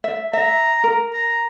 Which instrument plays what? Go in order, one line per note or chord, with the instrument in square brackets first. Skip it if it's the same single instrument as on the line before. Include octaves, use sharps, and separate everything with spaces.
[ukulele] E5
[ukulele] E5 [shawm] A#5
[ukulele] A#4
[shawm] A#5